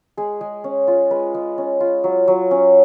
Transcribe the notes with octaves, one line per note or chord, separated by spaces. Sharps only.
G#3 G#4
G#3
C#4
F4
G#3 B4
G#3
C#4
F4
F#3
F#3
C#4